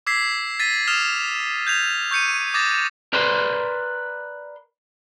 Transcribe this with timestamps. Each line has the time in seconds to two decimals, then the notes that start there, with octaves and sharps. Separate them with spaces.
0.07 D6 E6 G#6 B6 C7
0.60 A6 B6 D#7
0.87 D#6 F6 E7 F7
1.67 G6 G#6 B6 F7
2.11 C#6 G6 C#7 D#7
2.54 D6 D#6 A6 A#6
3.13 A#4 B4 D5 B5 C6